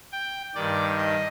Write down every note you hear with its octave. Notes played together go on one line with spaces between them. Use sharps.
G5
G2 D#3 D5
D#5